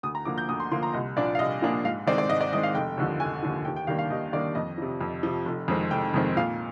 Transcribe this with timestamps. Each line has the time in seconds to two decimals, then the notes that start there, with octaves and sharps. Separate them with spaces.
0.03 D2 D#6
0.15 A#5
0.25 D3 F3 A#3 D6
0.38 G6
0.49 D2 D#6
0.60 C6
0.71 D3 F3 A#3 C6
0.83 A#5
0.93 C2 D#5
1.16 A#2 F3 A#3 D4 D5
1.35 F5
1.39 C2 D#5
1.62 A#2 F3 A#3 D4
1.84 G#2 F5
2.07 D#3 G#3 C4 D5
2.18 D5
2.29 G#2 D#5
2.41 D5
2.52 D#3 G#3 C4 D#5
2.63 F5
2.75 F1 G5
2.97 D#2 D3 F3
3.20 F1 G#5
3.43 D#2 D3 F3
3.65 D#2 G5
3.76 G5
3.87 D#3 G3 A#3 D4 F5
3.99 F5
4.10 D#2 D#5
4.33 D#3 G3 A#3 D4 D5
4.55 F2 D#5
4.78 C3 F3
5.01 F2
5.23 C3 F3
5.45 F1
5.68 F2 D#3 G#3 C4
5.91 F1 G5
6.14 F2 D#3 G#3 C4
6.36 A#2 F5